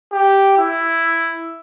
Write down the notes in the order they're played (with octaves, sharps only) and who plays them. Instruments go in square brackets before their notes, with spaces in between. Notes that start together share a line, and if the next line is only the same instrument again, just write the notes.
[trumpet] G4
E4